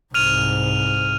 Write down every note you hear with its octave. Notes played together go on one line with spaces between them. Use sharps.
C2 G#2 F6 D#7 F7